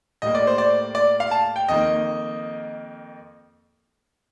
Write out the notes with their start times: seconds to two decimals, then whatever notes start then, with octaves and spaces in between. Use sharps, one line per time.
0.22 A2 G3 A#3 D#5
0.35 D5
0.47 C5
0.58 D5
0.95 D5
1.20 F5
1.31 A5
1.56 G5
1.68 F2 D#3 A#3 D#5